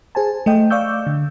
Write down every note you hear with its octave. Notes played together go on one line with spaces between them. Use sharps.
G#4 C5 G#5 A5
A3 D#5 G5
D5 F5 C#6 D6 E6 G6
D3